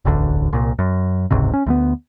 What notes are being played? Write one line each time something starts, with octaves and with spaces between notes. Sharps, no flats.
E1 A1 D2 D3
C2 A#2
F#2
F#1 C#2 G#2 C3
C#4
D2 G3 B3